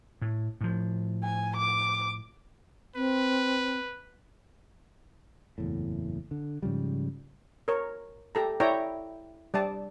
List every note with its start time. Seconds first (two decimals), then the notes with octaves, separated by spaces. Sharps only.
0.22 A2
0.61 A2 F3
1.23 G#5
1.56 D6
2.96 C4 B4
5.58 F#1 E2 A2
6.31 D3
6.62 G#2 C#3 F3 G3
7.68 A#4 C#5
8.35 G4 A4 A#5
8.60 E4 C#5 D5 E5 G5 A#5
9.54 G3 D5 A5